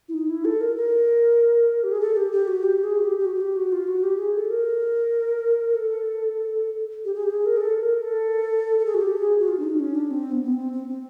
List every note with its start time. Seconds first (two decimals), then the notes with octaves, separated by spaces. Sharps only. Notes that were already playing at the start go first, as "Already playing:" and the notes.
0.08 E4
0.14 D#4
0.29 E4
0.45 A4
0.61 A#4
0.76 A#4
1.83 G4
1.92 G#4
2.01 A4
2.16 G4
2.32 G4
2.48 F#4
2.63 G4
2.83 G#4
2.99 F#4
3.04 G4
3.19 G4
3.25 F#4
3.35 F#4
3.41 G4
3.56 F#4
3.72 F4
3.87 F#4
4.03 G4
4.18 G#4
4.35 A4
4.50 A#4
5.74 A4
7.05 G4
7.14 G#4
7.23 G4
7.30 G#4
7.46 A#4
7.57 G#4
7.60 A4
7.82 A#4
8.03 A4
8.79 A4
8.86 G#4
8.94 F#4
9.01 G4
9.17 G#4
9.39 F#4
9.48 F4
9.59 D4
9.63 D#4
9.79 C#4
9.95 D4
10.11 C4
10.31 B3
10.43 B3
10.52 C4
10.73 C4
10.88 C4